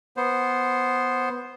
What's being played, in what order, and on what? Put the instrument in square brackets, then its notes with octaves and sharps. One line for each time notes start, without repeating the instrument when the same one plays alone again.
[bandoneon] B3 C5